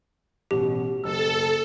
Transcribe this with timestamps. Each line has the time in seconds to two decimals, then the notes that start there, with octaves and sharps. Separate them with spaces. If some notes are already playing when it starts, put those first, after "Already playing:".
0.51 A1 B2 G4
1.04 F#1 A4 E6